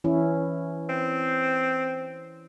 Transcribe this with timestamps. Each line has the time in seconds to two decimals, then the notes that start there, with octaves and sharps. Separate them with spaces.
0.04 E3 C#4 E4
0.89 C4